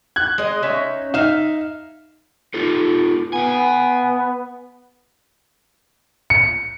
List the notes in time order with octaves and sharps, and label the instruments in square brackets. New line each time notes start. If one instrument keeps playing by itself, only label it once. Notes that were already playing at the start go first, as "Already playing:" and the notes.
[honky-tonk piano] F#6 G#6
[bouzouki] G#3 D#5
C#4 D#4 E5
[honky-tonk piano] D#4 [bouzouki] E5 F5
[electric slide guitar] D#4 F4 A4
[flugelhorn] B3 [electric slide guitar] F5 F#5 G#5
[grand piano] C#7